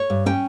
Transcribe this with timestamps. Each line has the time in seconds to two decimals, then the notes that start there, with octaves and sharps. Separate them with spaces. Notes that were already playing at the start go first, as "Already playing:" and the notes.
Already playing: C#5
0.10 G2
0.26 C#4 G5